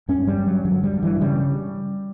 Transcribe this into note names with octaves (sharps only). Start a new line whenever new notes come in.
G2 C#4
G3
G2
F#3
D3 F#3
G3
G2
E3
C#3 G3